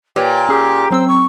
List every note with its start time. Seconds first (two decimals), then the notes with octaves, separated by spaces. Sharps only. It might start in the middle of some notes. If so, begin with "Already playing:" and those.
0.16 A#2 G4 B4 C#5 G5
0.49 C#4 G4 G#4
0.91 F#3 C4 C5 E6
1.08 C#6